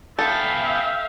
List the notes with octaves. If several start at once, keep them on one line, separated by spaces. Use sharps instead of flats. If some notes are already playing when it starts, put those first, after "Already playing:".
B3 C#4 A4 E5 F5 G5